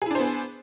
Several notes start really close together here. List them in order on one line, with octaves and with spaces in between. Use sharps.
G#4 E4 D4 C5 B3